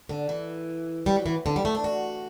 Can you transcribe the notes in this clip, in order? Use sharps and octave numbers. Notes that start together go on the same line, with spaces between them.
D3
E3
G3
F#3
E3
D3
G3
A3
D4
F#4